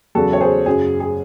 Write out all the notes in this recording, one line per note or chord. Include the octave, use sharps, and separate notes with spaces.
E2 C#3 F#3 F#4 A4
C#5
G#4 C5
F#2 C#3 F#3 G#4
G#4